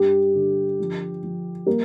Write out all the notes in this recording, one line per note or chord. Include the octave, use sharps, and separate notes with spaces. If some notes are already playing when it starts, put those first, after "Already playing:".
Already playing: G2 G3 G4
D3
F3
F3
G3 A#3 A#4